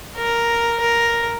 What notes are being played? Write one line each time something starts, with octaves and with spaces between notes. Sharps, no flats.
A#4
A#4